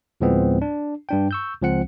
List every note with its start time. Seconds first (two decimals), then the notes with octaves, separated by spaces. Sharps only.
0.21 D2 A2 F3 G#3 B3 C4
0.62 D4
1.09 G2 D4 G5
1.31 C#6 E6 G6
1.62 C#2 F3 C4 F#5 C#7